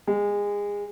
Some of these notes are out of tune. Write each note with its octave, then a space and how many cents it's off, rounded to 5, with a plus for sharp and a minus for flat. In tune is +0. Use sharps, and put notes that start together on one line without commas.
G#3 -25